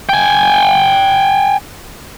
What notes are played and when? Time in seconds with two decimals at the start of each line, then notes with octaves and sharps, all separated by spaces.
0.09 G5 G#5